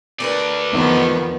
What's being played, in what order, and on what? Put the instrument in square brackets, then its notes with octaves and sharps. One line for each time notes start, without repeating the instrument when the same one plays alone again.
[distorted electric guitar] A3 D5 [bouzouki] D4 A#4 B4
[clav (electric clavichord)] E2 D#4 A#5 [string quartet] D#3 F3 B3